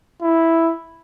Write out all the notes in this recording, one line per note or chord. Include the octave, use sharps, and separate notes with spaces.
E4